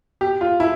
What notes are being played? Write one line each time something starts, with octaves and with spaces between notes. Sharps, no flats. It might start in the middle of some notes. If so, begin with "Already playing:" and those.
G4
F4
E4